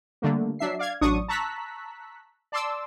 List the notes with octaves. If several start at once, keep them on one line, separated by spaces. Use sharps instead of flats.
D3 G3 A3 A#3
F#3 D4 E5 C7
D5 F5 G#6
A1 F#3 D4 C#6 D#6
A5 A#5 C#6 E6 F#6 B6
D5 A5 C6 D6 E6